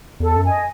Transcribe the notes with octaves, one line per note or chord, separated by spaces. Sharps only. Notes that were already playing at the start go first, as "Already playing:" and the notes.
E2 A4
F#2
D#5 G#5